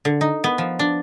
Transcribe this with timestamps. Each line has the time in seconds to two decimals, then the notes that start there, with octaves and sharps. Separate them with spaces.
0.05 D3
0.21 D#4
0.44 B3
0.58 F3
0.79 D4